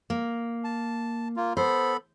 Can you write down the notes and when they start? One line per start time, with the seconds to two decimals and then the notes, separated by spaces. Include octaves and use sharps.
0.10 A#3
0.64 A5
1.37 A#3 F4
1.57 B3 A4 C5 B5